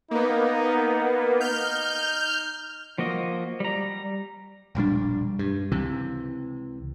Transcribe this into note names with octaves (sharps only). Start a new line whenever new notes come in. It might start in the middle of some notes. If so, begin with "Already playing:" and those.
A#3 B3 D#4
D#4 F6 G6
F3 A#3 F#4 D#5
G3 A#5
E1 A#1 G3 D4
G2
C#2 C3 E3